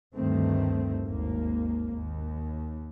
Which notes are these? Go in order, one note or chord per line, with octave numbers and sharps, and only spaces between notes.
D2 G2 D#3 A3 C4
G#1 D#2 A#3
D#2